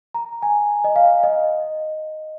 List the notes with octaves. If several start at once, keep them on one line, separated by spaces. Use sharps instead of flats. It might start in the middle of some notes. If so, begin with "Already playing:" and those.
A#5
G#5
D#5
F5
D#5